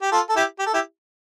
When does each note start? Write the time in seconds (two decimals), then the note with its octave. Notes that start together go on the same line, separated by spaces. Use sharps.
0.02 G4
0.12 F4 A4
0.30 A4
0.36 E4 G4
0.59 G4
0.66 A4
0.74 E4 G4